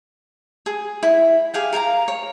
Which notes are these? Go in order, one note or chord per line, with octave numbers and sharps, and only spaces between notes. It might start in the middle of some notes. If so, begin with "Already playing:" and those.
G#4
E4
G4 G#4 F5 G5
A#4 F5 G#5 A#5
C#5